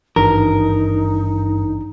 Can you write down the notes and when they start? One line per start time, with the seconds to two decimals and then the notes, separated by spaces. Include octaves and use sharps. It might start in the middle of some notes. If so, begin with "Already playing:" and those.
0.16 G#1 G2 E3 D4 D#4 A#4